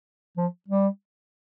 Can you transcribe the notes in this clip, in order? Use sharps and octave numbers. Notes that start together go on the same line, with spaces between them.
F3
G3